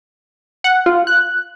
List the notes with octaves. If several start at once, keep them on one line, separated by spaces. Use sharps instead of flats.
F#5
F4
F#6